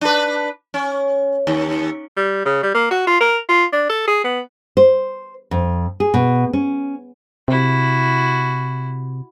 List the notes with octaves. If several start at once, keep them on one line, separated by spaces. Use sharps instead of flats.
D4 B4
C#4
D#2
G3
C#3
G3
A#3
F#4
F4
A#4
F4
D4
A4
G#4
B3
C5
F2
G#4
B2
C#4
C3 E4 F#4